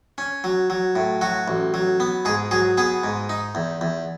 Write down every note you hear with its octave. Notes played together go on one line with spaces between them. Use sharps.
C#4
F#3
F#3
A2
F#3 F#4
A1
F#3
B3
G#2 G#4
F#3 G#4
B3 G#4
G#2
D#4
E2
E2